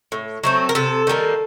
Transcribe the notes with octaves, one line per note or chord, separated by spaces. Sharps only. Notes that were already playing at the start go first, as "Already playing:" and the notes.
A2
F#3 A3 C4
A#4
C3 A4
D#3 G3 A#3